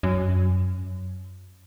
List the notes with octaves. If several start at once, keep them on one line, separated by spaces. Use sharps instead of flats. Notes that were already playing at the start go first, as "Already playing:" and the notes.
F#2